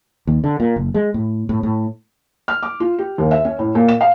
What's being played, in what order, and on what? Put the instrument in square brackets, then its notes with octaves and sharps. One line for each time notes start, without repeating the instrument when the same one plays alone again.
[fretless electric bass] D#2
D3
A#2
F#1
G#3
A2
A2
A2
[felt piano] F6
D6
F4
G4
D#2
E5
C#4
A2
A#2
E7
F5